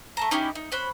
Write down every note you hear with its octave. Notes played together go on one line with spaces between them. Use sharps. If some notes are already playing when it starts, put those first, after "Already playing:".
A3 A5 A#5
C#4 D#4 E4 G4
D#4
C#4 C5 B5 F#6